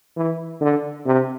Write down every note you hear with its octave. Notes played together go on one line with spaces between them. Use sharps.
E3
D3
C3